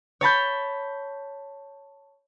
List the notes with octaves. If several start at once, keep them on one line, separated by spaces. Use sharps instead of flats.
C#5 A5 B5 G6